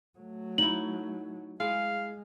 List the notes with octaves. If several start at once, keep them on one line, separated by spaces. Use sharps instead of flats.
F#3 A3
D#4 E4 F#7
G#3 E4 G#4 F5